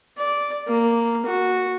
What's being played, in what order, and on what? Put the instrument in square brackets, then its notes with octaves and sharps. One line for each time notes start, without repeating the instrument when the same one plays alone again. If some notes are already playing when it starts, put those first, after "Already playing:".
[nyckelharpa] D5
A#3
F#4